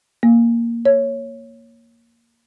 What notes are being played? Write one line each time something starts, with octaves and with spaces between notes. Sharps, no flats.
A#3
C#5